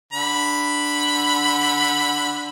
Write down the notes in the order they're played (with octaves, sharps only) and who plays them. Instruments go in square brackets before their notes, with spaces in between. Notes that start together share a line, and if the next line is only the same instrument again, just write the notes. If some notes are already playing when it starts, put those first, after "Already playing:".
[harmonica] D3 B5